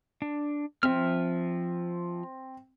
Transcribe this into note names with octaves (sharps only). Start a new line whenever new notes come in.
D4
F3 C4 E5 F6